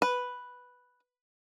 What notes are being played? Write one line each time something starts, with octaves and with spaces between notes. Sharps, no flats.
B4